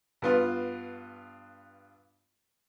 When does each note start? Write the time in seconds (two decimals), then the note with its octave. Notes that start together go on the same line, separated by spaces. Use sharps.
0.22 G2 B3 F4